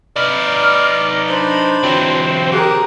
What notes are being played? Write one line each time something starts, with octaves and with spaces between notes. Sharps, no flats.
D#4 B4 D5 F6
D4 C5 B5
E3 F#3 C4
G4 G#4 A#4 F#6